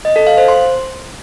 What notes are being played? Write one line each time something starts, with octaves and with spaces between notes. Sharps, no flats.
D#5
A4
F5
C5
C6